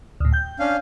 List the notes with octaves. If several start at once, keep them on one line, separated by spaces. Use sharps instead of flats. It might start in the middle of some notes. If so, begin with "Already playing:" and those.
D2 A2
G5 G6
C#4 D4 F5